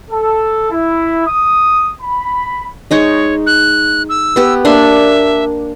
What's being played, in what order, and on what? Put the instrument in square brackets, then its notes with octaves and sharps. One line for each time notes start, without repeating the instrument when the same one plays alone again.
[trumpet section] A4
E4
D#6
B5
[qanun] G#3 D#4 C#6 [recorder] C#5
[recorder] F#6
E6
[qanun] B3 G4
[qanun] A#3 D4 C6 [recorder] E5